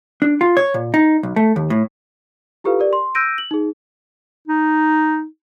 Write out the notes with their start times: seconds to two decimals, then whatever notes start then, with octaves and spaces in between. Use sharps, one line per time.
0.22 D4
0.41 F4
0.57 C#5
0.74 A#2
0.94 D#4
1.23 B1
1.36 A3
1.56 D#2
1.70 A2
2.64 E4 F4 G4 A4 B4 F5
2.79 G4 A#4 D5
2.93 C6
3.15 E6 F#6 G6 A#6 D7 D#7
3.38 F#7
3.51 D#4 G#4
4.48 D#4